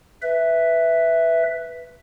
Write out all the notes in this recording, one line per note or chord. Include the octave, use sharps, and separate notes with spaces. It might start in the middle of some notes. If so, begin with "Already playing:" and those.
B4 E5